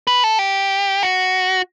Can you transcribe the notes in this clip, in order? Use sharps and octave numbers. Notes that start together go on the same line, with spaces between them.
B4
A4
G4
F#4